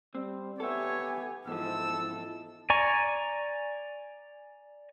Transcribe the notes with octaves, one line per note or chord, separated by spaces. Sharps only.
G3 C4
B3 G4 A4 C#5 E5 G#5
E2 G#2 F3 E4 A4 E6
D5 G#5 A#5 C#6